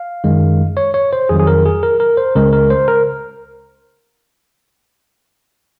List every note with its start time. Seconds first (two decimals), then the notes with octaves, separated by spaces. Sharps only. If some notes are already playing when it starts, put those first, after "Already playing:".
Already playing: F5
0.24 F#2 D#3 G#3
0.77 C#5
0.94 C#5
1.13 C5
1.29 F2 D#3 F#3 G#4
1.39 G#4
1.47 A#4
1.65 G#4
1.83 A#4
2.00 A#4
2.17 C5
2.35 C#2 C#3 G#3 A#4
2.53 A#4
2.70 C5
2.88 A#4